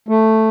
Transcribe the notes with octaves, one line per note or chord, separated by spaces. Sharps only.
A3